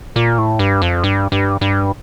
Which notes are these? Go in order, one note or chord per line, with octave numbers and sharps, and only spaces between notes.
A#2
A2
G2
F2
G2
G2
G2